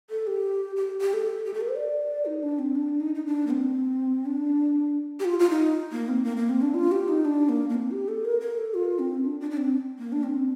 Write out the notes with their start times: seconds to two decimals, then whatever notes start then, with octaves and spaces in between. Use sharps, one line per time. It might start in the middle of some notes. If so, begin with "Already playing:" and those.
0.10 A4
0.27 G4
0.76 G4
1.01 G4
1.13 A4
1.46 G4
1.54 A4
1.61 A#4
1.69 C5
1.76 D5
2.25 D#4
2.43 D4
2.59 C4
2.75 D4
3.00 D#4
3.15 D#4
3.26 D4
3.47 A#3
3.51 C4
4.26 D4
5.20 G4
5.25 F4
5.39 F4
5.50 D#4
5.92 A#3
6.08 C4
6.24 A#3
6.37 A#3
6.49 C4
6.62 D4
6.74 F4
6.92 G4
7.08 D#4
7.25 D4
7.49 A#3
7.69 A#3
7.74 C4
7.91 G4
8.08 A4
8.25 A#4
8.41 A#4
8.58 A4
8.74 F4
8.99 C4
9.24 D4
9.40 D4
9.51 D4
9.57 C4
9.99 A#3
10.12 D4
10.23 C4